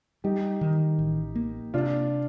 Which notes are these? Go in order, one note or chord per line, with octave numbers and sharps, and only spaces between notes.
G3 D#4 G4
D#3
A1
A#3
C3 D4 F4